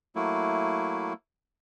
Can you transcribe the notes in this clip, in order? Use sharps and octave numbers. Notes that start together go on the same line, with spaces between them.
F#3 A3 A#3 E4